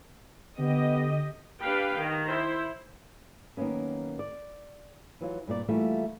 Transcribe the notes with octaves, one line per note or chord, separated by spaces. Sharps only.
D3 B3 G4 D#5
D4 G4 B4 F5 G5
D#3
E4 C5
D#3 F#3 A#3 B3 C#4
D5
E3 F#3 F4
G2 A#2 G#4 D5
E3 G3 A3 A#3 F4 F#4